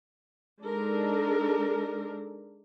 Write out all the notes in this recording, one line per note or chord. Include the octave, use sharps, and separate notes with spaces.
G#3 D4 D#4 A4 A#4